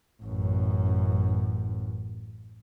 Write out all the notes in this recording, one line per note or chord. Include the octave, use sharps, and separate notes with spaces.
A1 F#2